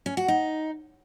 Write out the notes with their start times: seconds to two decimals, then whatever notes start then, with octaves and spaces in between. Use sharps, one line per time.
0.06 C#4
0.17 F#4
0.28 D#4